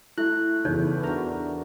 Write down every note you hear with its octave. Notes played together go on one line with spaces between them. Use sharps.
A3 E4 C6 F#6
E2 C#3 D#4 C#5
D4 F#4 A#4 A#5